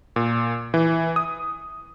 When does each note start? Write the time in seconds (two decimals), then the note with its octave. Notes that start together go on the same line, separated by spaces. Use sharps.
0.16 A#2
0.74 E3
1.16 D#6